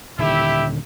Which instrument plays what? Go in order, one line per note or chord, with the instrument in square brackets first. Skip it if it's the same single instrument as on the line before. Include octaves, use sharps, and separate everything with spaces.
[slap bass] D#1 D3 D#3 [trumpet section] E4 G4 E5